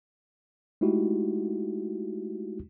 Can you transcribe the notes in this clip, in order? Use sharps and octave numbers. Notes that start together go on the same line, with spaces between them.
G#3 A3 D#4 E4 F#4 G4